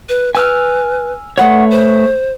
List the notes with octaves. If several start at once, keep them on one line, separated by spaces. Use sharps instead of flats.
B4
B4 G#5 E6 F6
A3 B4 C#5 F#5
C5